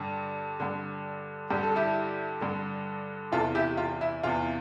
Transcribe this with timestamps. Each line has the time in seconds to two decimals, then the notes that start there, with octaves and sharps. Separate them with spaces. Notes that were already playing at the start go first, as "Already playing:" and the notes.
Already playing: G2 D3
0.60 G2 D3
1.50 G2 D3 G4
1.63 A4
1.76 E4 G4
2.41 G2 D3
3.32 E2 C3 E3 F4 A4
3.55 E4 G4
3.77 F4
4.01 E4
4.23 E2 C3 E3 F4